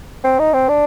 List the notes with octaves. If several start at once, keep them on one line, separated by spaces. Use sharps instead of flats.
C4
D#4
C4
D4